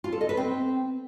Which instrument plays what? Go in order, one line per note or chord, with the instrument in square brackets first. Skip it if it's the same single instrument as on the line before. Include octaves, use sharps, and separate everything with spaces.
[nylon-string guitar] F4
A4
D#5
B4
C4